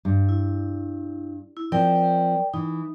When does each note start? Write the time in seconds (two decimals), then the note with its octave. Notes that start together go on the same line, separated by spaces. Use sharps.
0.05 G2
0.29 E4
1.57 E4
1.72 F3 C4 A#4 D5 G5
2.54 E3 D#4